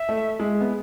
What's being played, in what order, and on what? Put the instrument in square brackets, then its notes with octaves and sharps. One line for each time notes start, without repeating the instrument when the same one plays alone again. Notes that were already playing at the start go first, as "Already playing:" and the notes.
Already playing: [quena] E5
[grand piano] A3
G#3
B3